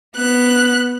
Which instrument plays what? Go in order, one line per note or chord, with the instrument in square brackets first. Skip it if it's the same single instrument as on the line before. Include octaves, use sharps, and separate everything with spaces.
[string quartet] B3 F#6